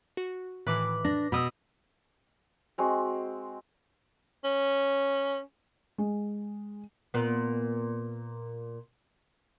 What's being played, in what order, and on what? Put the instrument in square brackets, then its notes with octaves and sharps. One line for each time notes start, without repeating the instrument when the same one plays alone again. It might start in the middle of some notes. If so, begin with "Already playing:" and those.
[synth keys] F#4
[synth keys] A2 D#3 E3 [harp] B4 D6
[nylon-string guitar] D4 [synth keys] A#6
[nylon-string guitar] B2 [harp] B5 D#6 E6
[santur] G#3 C4 F#4
[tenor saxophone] C#4
[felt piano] G#3
[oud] A#2 B3